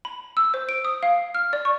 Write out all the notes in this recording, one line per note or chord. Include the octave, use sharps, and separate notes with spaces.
B5
E6
C5
D7
D#6
F5
F6
D5
C#6